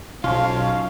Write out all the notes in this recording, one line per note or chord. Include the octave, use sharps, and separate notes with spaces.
B1 B2 F3 C#4 F4 F5